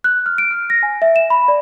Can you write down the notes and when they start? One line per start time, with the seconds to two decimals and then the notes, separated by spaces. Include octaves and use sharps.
0.04 F#6
0.26 F6
0.38 D7
0.51 F6
0.70 A#6
0.83 G#5
1.02 E5
1.16 E7
1.30 B5
1.48 D5